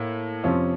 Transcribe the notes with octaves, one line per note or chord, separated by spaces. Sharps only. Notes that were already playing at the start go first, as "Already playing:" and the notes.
Already playing: A2 A#3
F2 C3 F3 C#4